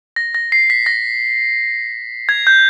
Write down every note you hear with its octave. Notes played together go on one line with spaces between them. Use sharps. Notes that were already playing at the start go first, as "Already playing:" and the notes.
A#6
A#6
C7
B6
A#6
G#6
G6